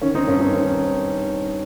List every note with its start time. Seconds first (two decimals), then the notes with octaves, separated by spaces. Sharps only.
0.02 D#3 C#4
0.15 C4 D#4
0.27 G2 C#4
0.40 C4 D#4
0.53 D#3 C#4
0.70 C4